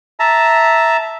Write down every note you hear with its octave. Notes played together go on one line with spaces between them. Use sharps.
E5 A5 A#5